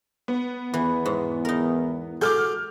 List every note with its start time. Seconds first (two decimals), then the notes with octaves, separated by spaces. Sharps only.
0.28 B3
0.74 E2 E3
1.06 G#2
1.45 D#4 A#4
2.21 F#4 G#4 A4 D6 F6 G6